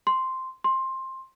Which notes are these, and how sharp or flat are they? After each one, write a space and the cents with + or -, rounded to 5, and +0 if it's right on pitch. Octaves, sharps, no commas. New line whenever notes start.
C6 -5
C6 +15